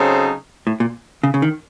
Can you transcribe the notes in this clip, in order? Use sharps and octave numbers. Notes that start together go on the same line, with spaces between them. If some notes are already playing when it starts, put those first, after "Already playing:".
Already playing: C#3 F#3 C4 D#4 A4
A2
A#2
C#3
C#3
D#3